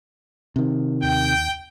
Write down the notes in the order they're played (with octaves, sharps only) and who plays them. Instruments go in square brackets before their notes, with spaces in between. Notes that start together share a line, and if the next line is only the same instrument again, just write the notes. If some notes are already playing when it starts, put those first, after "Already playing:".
[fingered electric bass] C3 D#3
[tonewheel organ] D#2 [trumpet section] G5